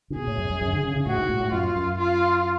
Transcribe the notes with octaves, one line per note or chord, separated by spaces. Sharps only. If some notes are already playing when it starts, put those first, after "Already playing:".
C#3
B2 G#4
A2
F#2
F#2
F#2
C#3
D3
C#3
C#3
A2 F#4
G#2
A2
A2
F#2 F4
F#2
F4